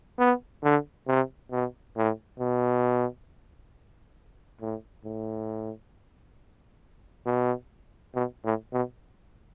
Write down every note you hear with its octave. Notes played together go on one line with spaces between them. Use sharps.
B3
D3
C3
B2
A2
B2
A2
A2
B2
B2
A2
B2